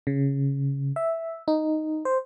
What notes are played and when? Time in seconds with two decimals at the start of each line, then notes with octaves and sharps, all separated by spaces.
0.07 C#3
0.96 E5
1.48 D#4
2.05 C5